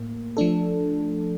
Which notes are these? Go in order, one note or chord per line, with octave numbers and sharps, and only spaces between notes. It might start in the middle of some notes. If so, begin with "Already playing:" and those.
Already playing: A2 A#3
F3 A3 D4 A4